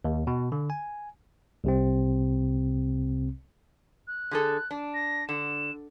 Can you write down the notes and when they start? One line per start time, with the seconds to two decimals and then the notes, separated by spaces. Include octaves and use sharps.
0.05 D#2
0.27 B2
0.52 D3
0.70 G#5
1.64 C2 C3 C4
4.08 F#6
4.31 D3 G#4 A4
4.71 D4
4.94 A#6
5.29 D3 E7